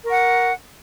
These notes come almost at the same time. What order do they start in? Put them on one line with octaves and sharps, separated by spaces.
A#4 C#6 F#5